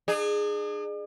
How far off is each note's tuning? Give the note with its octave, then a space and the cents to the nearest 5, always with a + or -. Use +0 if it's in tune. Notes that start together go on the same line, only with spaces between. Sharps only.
D4 +45 G#4 +0